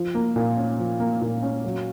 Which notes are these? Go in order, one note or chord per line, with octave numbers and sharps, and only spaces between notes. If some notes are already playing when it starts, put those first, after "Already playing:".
Already playing: F3
A#3
A#2
C#4
F3
A#3
A#2
C#4
F#3